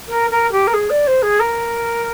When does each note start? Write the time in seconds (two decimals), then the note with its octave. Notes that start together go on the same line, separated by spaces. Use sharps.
0.08 A#4
0.31 A#4
0.52 G4
0.67 A#4
0.74 G#4
0.90 D5
1.07 C5
1.22 G#4
1.40 A#4